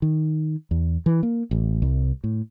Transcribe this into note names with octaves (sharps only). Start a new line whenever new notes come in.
D#3
E2
E3
A#3
A1
C2
A2